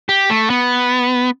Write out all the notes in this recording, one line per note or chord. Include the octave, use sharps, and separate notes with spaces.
G4
A3
B3